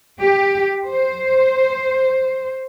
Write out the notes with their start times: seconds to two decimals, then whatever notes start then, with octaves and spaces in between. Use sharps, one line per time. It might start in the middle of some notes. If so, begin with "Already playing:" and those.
0.21 G4
0.86 C5